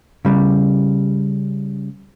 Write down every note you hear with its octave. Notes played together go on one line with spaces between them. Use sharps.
C#3 G3